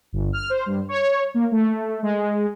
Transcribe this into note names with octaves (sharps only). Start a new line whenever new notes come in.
G1
F6
C5
G2
C#5
A#3
A3
G#3